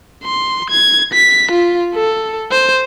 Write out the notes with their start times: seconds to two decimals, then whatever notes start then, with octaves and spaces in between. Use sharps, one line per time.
0.24 C6
0.70 G#6
1.14 B6
1.52 F4
1.95 A4
2.51 C5